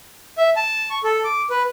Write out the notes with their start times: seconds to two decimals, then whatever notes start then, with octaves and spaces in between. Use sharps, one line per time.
0.38 E5
0.56 A5
0.90 C#6
1.04 A4
1.24 D6
1.50 B4